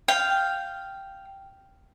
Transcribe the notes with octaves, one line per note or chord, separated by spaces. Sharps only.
F5 G5